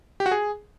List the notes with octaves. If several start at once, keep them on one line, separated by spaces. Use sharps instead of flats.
G4
F#4
G#4